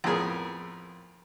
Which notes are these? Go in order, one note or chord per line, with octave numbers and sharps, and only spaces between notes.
F2 A2 B3 G#4 A#4